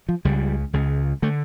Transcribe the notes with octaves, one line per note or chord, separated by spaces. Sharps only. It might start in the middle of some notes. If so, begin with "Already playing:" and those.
F3
C#2 C#3 G3
C#2 C#3
D3 A3